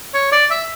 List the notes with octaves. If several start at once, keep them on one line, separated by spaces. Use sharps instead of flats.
C#5
D5
E5